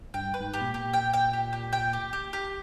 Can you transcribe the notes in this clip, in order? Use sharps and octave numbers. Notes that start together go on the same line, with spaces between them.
G2 G5
B4
G#2
G4
B2
A#2
G4
G5
G5
G4
G4
G5
G4
G4
G4